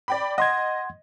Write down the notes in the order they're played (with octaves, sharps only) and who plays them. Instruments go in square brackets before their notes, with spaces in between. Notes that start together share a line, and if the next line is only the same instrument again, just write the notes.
[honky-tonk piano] D5 G5 B5
[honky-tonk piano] D#5 [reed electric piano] F#5 C6 G#6